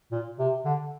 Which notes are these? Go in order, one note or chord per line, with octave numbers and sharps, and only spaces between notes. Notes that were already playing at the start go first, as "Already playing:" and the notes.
A#2
C3
D3